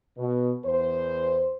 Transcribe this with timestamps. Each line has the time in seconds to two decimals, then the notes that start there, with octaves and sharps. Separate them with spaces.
0.18 B2
0.65 E2 C5